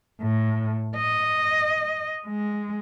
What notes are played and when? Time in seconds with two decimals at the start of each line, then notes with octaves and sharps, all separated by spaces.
0.21 A2
0.96 D#5
2.27 G#3